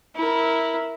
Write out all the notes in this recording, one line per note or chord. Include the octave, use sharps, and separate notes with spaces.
E4 A#4